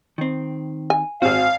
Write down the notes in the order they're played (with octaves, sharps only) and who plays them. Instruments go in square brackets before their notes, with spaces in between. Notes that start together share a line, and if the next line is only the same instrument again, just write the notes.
[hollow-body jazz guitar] D#3 C4
[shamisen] G#5
[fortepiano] G#1 C4 [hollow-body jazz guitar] F#4 G#4 [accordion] F5